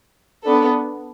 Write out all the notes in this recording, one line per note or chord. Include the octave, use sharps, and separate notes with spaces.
B3 D4 A4